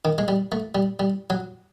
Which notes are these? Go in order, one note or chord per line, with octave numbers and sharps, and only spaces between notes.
D#3
G#3
G3
A3
G3
G3
F#3